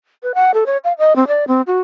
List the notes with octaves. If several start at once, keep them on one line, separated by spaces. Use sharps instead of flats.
B4
F#5
A4
C#5
F5
D#5
C4
D5
C4
F#4